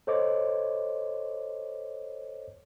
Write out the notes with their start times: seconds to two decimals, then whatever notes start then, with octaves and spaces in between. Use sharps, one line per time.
0.07 A4 C5 C#5 D#5 D6